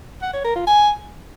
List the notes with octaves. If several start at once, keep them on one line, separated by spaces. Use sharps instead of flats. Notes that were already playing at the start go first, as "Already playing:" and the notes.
F#5
C#5
A#4
F4
G#5